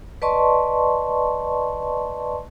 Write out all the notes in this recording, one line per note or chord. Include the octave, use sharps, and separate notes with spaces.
B4 D5 D#5 A5 C6 C#6